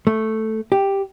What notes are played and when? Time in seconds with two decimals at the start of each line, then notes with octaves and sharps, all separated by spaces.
0.07 A3
0.72 G4